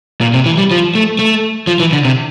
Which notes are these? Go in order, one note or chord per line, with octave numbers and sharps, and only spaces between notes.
A#2
C3
E3
G3
F3
A3
A3
F3
E3
D3
C3